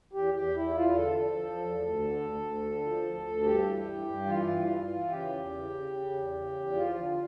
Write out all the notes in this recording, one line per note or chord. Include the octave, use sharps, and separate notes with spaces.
E2 G4
E2 G4
E2 E4
E2 F4
D3 A4
F3
F3
E2
D2
D3
D2
D2
D3
F3
D2
D2
G2 G4
E3
G2
G2
E3 F4
G2
E3
E3
C#3 G4
E2
C#3
C#3
C#3
E2
C#3
E2
F3 F4
D3